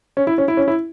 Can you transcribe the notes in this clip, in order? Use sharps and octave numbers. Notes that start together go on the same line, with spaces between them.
C#4
E4
C#4
E4
C#4
E4